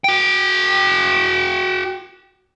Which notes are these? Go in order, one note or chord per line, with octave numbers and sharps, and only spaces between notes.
F#4 G5